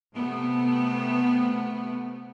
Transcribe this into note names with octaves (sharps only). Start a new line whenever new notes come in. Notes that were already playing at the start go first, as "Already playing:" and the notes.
C3 A3 B3